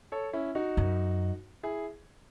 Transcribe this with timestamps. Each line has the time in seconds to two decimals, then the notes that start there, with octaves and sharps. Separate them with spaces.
0.12 A4 C#5
0.33 C#4 E4
0.55 D#4 F#4
0.77 F#2
1.63 E4 G#4